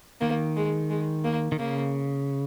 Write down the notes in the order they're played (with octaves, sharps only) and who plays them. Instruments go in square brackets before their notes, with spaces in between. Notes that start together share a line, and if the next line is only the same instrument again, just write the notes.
[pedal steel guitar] D#3 [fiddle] A#3
[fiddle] G#3
G#3
A#3
[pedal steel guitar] D#3
[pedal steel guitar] C#3 [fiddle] A#3